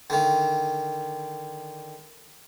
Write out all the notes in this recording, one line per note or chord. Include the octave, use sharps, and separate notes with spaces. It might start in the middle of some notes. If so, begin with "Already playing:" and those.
D3 D#3